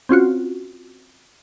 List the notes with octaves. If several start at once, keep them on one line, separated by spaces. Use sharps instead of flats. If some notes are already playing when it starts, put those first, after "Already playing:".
C4 C#4 F4 F#4